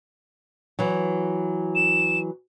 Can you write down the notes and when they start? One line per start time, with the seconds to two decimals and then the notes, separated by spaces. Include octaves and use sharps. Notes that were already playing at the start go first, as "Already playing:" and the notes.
0.79 E3 F#3
1.75 E7